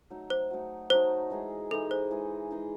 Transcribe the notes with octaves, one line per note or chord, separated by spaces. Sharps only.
F#3 A3 D#4
C5
F#3 A3 D#4
F#3 A3 D#4 C5
E3 G#3 D#4 G#4
E3 G#3 D#4 G#4 A4
C5
E3 G#3 D#4 G#4
E3 G#3 D#4 G#4